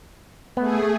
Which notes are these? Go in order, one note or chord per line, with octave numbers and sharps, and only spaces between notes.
A3 B3 G#4